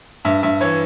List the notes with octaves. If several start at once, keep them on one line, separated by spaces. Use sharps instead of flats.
G2 E5
G2 E5
E3 C#5